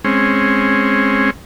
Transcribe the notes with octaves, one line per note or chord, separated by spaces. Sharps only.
G#3 C4 C#4